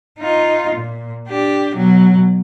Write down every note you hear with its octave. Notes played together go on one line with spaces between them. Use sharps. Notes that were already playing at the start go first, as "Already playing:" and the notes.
D#4 F4
A#2
D4 G4
B2 F#3